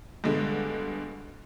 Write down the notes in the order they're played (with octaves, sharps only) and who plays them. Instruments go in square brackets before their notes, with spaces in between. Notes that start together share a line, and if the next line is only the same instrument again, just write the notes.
[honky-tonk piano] G2 B2 D3 G#3